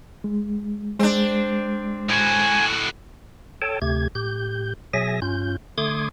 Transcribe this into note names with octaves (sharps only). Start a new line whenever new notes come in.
G#3
G#3 C4 D4
A2 F#4 G#5
A4 C#5 G5 A5
D2 C3 A3 G4 G#6
A2 G4 G6
B2 F#3 G#4 E5 G#5 A#6
G2 C#4 F4 G6
D3 A3 C6 D6 D#6 G#6